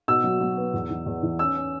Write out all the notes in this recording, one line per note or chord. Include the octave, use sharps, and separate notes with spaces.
B2 E6
F#3
F#3
B3
E2
E3
E2
E3
C#4 E6
C#4